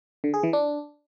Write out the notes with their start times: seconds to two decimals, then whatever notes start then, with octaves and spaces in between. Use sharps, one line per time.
0.24 D3
0.34 G#4
0.43 E3
0.53 D4